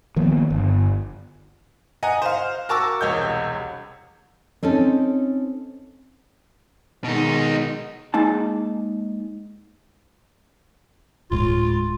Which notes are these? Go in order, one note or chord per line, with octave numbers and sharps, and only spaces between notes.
D#3 F3 A#3 B3
G1
D#5 F#5 G#5 A#5
C5 F5
F#4 A#4 A5 C#6 D6 E6
E1 C2 C#5 D#5 G6
C4 C#4 D#4 A4
B2 D#3 G#3 D#4
G#3 A#3 D#4 A5
D1 A2 G#3 F4